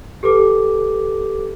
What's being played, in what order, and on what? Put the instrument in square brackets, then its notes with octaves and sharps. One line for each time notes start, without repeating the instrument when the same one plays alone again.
[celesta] G4 A4 B4 D6